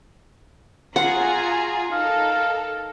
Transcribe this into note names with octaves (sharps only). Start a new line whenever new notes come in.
F4 F#4 G#4 F#5 G#5 A#5
D#4 A4 A#4 F5